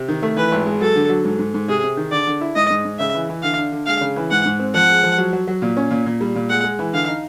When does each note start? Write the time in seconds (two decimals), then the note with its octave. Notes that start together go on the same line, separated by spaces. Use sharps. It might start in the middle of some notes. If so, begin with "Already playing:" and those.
Already playing: C3
0.08 D#3
0.23 A3
0.37 E3 B4
0.52 G#1
0.67 G#3
0.81 F#3 A4
0.96 D3
1.09 F#3
1.24 G#2
1.39 G#2
1.54 G#2
1.68 C3 G#4
1.83 C3
1.97 D#3
2.12 D3 D5
2.27 D3
2.41 E4
2.56 G#2 D#5
2.70 G#2
2.85 G#2
2.99 C#3 E5
3.14 E3
3.29 E3
3.43 D3 F5
3.58 D4
3.72 D3
3.86 G#3 F5
4.01 C#3
4.16 E3
4.31 G#2 F#5
4.45 G#2
4.60 C4
4.74 F3 F#5
4.89 G#3
5.03 F3
5.18 F#3
5.33 F#3
5.47 F#3
5.62 A#2
5.77 C#4
5.91 A#2
6.06 A#2
6.21 G3
6.35 A#2
6.49 G#3 F#5
6.64 G#3
6.79 E3
6.93 D3 F5
7.08 D#4